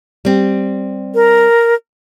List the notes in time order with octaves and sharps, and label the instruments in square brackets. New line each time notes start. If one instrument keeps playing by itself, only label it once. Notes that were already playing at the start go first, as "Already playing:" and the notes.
[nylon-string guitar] G3 C4
[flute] A#4